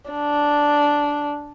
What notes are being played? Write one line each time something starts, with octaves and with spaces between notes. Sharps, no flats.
D4